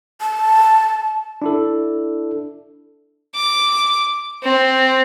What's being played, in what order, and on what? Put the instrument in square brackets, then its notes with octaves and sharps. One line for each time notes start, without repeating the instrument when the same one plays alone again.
[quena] A5
[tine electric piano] D4 E4 A4
[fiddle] D6
C4